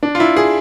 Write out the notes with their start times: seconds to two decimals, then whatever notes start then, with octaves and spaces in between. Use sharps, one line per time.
0.03 D4
0.15 F4
0.20 E4
0.37 G#4